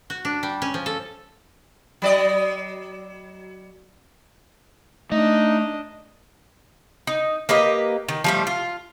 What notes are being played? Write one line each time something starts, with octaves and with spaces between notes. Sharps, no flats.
F#4
D4
G3
C#4
F3
A4
F#3 D5 D#5
A3 D4 D#4 D#5
D#4
A#3 G4 B4 D#5
D#3
F3 G3 A3
F4